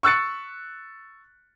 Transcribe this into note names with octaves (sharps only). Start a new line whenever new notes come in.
C#6 E6 F#6 A6 C#7